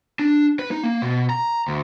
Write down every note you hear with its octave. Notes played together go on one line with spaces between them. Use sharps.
D4
B4
D#4
A#3
B2
A#5
D2